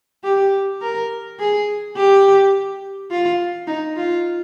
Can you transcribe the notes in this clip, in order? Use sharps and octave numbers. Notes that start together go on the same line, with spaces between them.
G4
A#4
G#4
G4
F4
D#4
F4